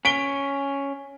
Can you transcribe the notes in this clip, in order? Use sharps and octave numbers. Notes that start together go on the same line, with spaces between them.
C#4 B6 D7 G7